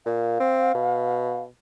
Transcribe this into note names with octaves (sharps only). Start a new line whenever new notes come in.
A#2 F5
C4
B2